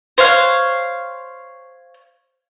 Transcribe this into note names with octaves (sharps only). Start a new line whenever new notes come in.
C5 C#5 F5 F#6